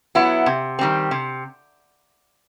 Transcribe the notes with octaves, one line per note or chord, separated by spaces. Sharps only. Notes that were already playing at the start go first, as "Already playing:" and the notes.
F#3 B3 E4
C3
D#3 G3 C4
C3